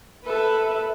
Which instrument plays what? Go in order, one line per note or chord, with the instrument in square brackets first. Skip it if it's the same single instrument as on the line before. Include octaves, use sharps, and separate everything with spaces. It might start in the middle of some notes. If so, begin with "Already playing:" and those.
[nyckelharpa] A4 [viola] B4 E5